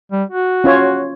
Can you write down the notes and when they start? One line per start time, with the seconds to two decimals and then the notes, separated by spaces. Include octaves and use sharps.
0.12 G3
0.30 F#4
0.64 C#4 F4 C#5